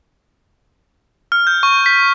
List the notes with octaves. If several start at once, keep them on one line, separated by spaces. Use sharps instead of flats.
F6
G6
C#6
B6